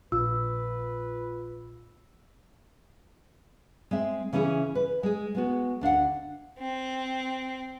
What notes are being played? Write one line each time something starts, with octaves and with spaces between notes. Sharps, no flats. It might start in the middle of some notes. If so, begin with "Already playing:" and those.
A#1 F4 B4 E6
G#3 C4 E5
C#3 E3 C#4 E4 G#4
B4
G#3 G#4
G#3 B3 F#4
D2 D4 F5 F#5
C4